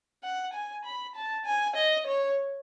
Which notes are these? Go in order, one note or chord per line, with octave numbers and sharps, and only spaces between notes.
F#5
G#5
B5
A5
G#5
D#5
C#5